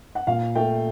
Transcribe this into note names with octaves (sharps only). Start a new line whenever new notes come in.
F#5
A#2 F5
A3 G5